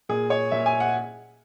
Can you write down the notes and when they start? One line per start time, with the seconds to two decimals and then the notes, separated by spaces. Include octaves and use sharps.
0.09 A#2 G#4
0.30 C#5
0.51 A#2 E5
0.66 G#5
0.80 F#5